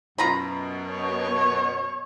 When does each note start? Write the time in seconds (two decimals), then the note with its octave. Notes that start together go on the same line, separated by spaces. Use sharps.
0.18 F#2 B2 F4 A#5 B5
0.90 C#5